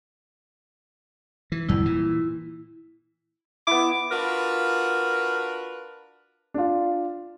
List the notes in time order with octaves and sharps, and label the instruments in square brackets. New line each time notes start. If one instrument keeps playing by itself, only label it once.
[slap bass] E3
[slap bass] G1 E2 G3 [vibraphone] E4
[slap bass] A#2 E3
[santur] B3 E4 [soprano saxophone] D6
[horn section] D4 F4 F#4 A#4 B4
[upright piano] D4 F4